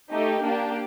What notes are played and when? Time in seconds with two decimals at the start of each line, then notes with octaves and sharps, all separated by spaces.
0.10 A3 D#4 G4
0.42 A#3 D4 G4